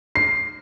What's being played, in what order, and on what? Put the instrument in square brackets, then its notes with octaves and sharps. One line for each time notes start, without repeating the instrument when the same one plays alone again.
[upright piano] C7